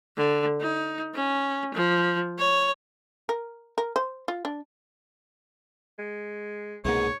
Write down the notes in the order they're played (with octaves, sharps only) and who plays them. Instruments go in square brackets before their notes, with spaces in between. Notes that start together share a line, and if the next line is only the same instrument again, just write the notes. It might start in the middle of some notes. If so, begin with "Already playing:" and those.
[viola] D3
D#4
C#4
F3
C#5
[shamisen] A#4
A#4
C5
F4
D4
[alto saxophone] G#3
[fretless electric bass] C2 A#3 [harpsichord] G#2 B2 G#3 [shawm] C#5